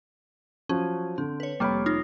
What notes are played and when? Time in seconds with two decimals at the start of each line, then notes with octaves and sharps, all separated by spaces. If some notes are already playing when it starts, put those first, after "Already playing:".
0.69 F3 F#3 C#4
1.18 D3 C4
1.40 B4 C#5
1.60 F1 G3 A#3 G4 C#5 B5
1.86 D#4 F4